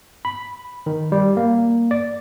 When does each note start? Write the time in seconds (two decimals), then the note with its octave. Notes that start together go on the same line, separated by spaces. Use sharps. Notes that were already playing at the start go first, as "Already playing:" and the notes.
0.25 B5
0.86 D#3
1.12 G3
1.37 A#3
1.91 D5